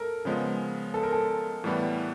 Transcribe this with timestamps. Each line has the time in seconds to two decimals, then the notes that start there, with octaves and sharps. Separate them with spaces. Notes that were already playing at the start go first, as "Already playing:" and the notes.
Already playing: A4 A#4
0.25 C#3 F3 G#3 B3
0.94 A4
1.03 A#4
1.13 A4
1.64 A2 E3 G3 B3